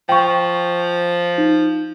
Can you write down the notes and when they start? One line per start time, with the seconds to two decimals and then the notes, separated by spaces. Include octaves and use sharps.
0.09 F3 G5 C#6
1.38 D#4